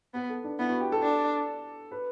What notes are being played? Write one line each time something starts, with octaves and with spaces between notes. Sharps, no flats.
B3 B4
A4
D4
B3 E4
F#4
G4
A4
D4
B4